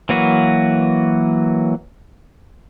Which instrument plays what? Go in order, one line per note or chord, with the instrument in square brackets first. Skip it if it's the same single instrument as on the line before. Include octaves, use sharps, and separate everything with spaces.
[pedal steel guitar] E3 F#3 A#3 F#4 B4